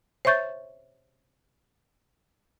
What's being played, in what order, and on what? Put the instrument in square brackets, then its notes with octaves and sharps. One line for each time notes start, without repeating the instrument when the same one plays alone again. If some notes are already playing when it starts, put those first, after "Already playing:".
[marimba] C5 C#5 E5 C#6 G6 A6